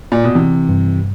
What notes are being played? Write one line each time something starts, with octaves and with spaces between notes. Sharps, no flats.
A#2
B2
C3 E3
G2